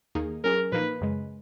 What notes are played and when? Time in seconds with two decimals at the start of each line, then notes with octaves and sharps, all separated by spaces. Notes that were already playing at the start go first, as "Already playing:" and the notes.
0.15 D#2 D#3 A#3 D#4 G#4
0.44 F#3 C#4 G#4 A#4
0.72 A#2 F3 A#3 D#4 B4
1.01 F#2 C#3 G#3